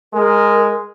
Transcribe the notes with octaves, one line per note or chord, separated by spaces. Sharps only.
G#3 A#4